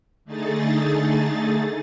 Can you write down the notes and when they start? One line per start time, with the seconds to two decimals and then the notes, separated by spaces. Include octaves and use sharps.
0.25 D3 A3 D#4 G#4 A6